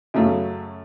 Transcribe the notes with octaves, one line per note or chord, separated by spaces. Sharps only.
F#2 C#3 F#3 A3